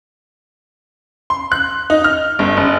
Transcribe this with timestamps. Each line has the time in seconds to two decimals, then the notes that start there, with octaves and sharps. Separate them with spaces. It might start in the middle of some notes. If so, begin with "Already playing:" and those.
1.30 C6
1.52 F#6
1.90 D#4
2.04 F6
2.39 G1
2.57 F#1